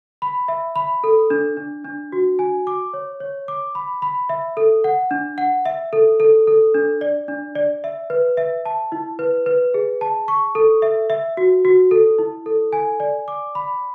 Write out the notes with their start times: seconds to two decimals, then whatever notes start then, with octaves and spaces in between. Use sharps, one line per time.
0.22 B5
0.48 E5
0.76 B5
1.04 A4
1.30 D4
1.57 D4
1.85 D4
2.12 F#4
2.39 G#5
2.67 D6
2.93 C#5
3.20 C#5
3.48 D6
3.75 B5
4.02 B5
4.29 E5
4.57 A4
4.84 F#5
5.11 D4
5.38 F#5
5.66 E5
5.93 A4
6.20 A4
6.47 A4
6.74 D4
7.01 D5
7.28 D4
7.55 D5
7.84 E5
8.10 B4
8.37 E5
8.65 A5
8.92 E4
9.19 B4
9.46 B4
9.74 G#4
10.01 A5
10.28 C#6
10.55 A4
10.82 E5
11.10 E5
11.37 F#4
11.65 F#4
11.91 A4
12.19 E4
12.46 A4
12.73 G#5
13.00 D5
13.28 D6
13.55 B5